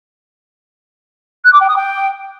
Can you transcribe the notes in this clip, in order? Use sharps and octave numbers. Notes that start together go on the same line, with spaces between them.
F#6
D6
G5
D#6
G5